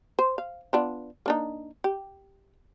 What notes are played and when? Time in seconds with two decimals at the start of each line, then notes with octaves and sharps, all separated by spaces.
0.19 C5
0.38 F5
0.73 B3 D4 F4
1.26 A#3 D4 D#4
1.84 G4